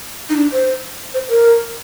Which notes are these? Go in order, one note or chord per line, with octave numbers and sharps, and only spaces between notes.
D#4
D4
C5
C5
A#4